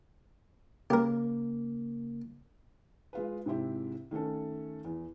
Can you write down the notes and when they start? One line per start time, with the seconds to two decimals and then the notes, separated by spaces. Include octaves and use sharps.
0.90 C#3 A#3 G4 A#4
3.13 G#3 F4 B4
3.46 G#2 C3 C4 E4 G4
4.11 D#3 A3 C#4 A4
4.85 E2